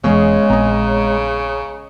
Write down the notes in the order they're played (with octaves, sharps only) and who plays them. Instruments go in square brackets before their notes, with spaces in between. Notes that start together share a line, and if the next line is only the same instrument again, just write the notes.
[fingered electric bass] E1 E3 B3 [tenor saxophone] C#3 [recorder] G#3 [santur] C#4 G#4
[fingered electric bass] A#1 B3 C4 [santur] D#5 A#5